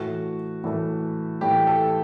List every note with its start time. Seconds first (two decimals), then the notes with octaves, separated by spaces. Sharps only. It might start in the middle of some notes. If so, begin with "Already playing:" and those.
Already playing: A2 E3 A3 F#4
0.64 A2 E3 A3
1.41 A2 E3 A3 G4
1.67 A4